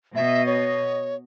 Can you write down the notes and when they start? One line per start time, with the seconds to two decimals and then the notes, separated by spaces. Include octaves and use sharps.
0.15 B2 D#5 E5
0.46 C#5